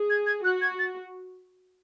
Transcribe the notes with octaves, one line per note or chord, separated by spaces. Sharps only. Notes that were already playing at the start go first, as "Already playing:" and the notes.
Already playing: G#4
G#6
G#6
F#4 F#6
G#6
A6